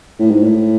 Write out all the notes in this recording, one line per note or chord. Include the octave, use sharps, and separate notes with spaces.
A2
G#2
A2